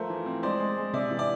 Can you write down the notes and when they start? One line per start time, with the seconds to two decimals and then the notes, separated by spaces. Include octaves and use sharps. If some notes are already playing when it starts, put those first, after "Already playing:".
Already playing: F3 A3 A#4 C5
0.10 E3
0.26 C4
0.43 G#3 C5 D5
0.60 G#3
0.77 G#3
0.93 C3 D5 E5
1.11 E3
1.19 D5 E5